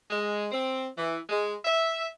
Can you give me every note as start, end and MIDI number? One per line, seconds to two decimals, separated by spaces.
0.11 0.46 56
0.52 0.87 60
0.96 1.18 52
1.29 1.55 56
1.65 2.08 76